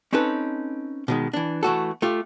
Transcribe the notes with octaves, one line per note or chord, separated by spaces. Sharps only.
C4 C#4 D#4 A4 B4
B2 D#3 G#3
E3 D4
E3 A3 F#4 A4
A3 F4 G4